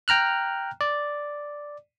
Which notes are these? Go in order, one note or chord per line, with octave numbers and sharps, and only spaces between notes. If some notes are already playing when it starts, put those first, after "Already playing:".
G5 A#5 F6 F#6
D5